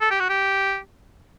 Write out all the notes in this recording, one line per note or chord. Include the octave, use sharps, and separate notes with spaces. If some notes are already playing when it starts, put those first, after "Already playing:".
A4
G4
F#4
G4